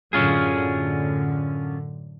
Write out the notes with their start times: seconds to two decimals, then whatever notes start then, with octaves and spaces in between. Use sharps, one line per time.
0.13 F#2 A2 D3 C#4 F4 G#4